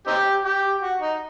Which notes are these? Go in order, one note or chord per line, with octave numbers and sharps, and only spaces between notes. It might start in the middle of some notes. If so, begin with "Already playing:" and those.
C4 D#4 G4
G4
F#4
D#4